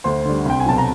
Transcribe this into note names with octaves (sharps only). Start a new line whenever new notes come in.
D2 C5 C6
D3 G3
C2 G5
G#5
B2 F#3 A5
A#5